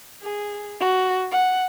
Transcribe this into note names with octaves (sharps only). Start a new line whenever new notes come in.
G#4
F#4
F#5